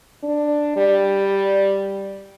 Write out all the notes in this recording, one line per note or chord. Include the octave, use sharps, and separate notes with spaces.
D4
G3